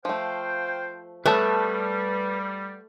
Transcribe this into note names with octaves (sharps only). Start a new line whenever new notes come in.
F3 A3 C5 F5 G5
G3 A3 B3 A4 B4 C#5 A5